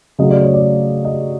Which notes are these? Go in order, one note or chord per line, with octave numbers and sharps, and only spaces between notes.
C#3 F#3 A3 D#5
D5
C#5
D5
D#5